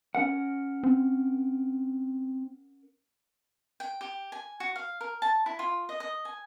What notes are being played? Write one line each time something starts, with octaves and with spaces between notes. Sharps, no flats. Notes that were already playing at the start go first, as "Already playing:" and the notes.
C#4 A#4 F#5
C4
G5
G4
G#5
F#4
F5
A#4
A5
E4
F4
D#5
D#5
G#5